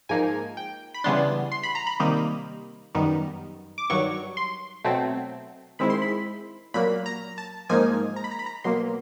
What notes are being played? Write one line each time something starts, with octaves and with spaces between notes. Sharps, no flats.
G#2 F3 A#3 D#4 G#5
G5
B5
C#3 E3 G3 B3 D4 C6
C6
B5
A#5
B5
C3 D#3 G3 A#3 D#4
F#2 D#3 G3 B3 D#4
D6
G2 D#3 F#3 C#6
C6
B2 F#3 A3 C4
D#3 G#3 C4 E4 B5
C6
B5
A#2 F#3 A#3 B5
A#5
A5
G#2 F3 A#3 D#4 G#5
A#5
B5
A#5
B5
A#5
B2 F#3 A#3 C6